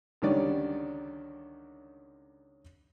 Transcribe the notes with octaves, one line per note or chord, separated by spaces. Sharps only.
C#2 D3 D#3 G3 C#4 D5